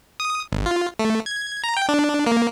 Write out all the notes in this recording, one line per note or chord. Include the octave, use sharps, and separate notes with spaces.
D#6
G#1
F4
A3
G#6
A#5
G5
D4
A#3